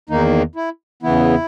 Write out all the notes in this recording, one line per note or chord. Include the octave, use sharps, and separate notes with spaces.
E2 D#3 A#3 D#4
E4
E2 C#3 E3 B3 E4